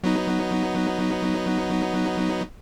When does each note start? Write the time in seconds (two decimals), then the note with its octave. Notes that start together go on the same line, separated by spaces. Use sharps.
0.04 F#3 B3 D#4